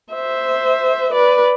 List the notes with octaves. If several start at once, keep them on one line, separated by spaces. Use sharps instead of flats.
C5 E5
B4 D5